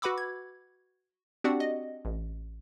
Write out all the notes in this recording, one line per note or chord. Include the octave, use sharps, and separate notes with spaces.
F#4 B4 F#5 B5 D6 E6
G#6
C4 D4 F#4 G4 D5 F#5
D#5
A1